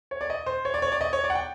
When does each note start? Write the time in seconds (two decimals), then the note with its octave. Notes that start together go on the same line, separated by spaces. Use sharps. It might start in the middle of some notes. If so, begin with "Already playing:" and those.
0.11 C#5
0.21 D5
0.30 D#5
0.46 C5
0.65 C#5
0.74 D5
0.82 C#5
0.92 D5
1.01 D#5
1.13 C#5
1.24 D5
1.30 F#5
1.35 G5